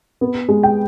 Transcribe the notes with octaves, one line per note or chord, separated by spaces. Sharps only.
B3
G#3
G5